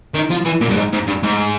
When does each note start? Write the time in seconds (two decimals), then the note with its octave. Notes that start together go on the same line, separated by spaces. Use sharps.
0.14 D#3
0.30 F3
0.45 E3
0.61 A#2
0.69 G2
0.76 G#2
0.92 G#2
1.07 G2
1.23 G#2